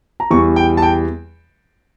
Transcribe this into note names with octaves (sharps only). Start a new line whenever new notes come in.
A#5
E2 E3 G3 C#6
G5
A5
G5